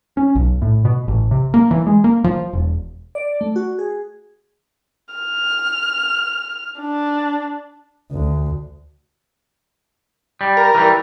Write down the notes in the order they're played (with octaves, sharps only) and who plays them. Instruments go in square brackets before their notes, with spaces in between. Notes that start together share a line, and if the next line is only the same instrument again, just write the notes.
[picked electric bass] C#4
B1
A2
B2
A1
C3
A#3
E3
G#3
A#3
F3
E1
[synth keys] D5
A3
F#4
G#4
[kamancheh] F6
D4
[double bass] D2
[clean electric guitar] G3
[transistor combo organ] A#4
[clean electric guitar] E3 G3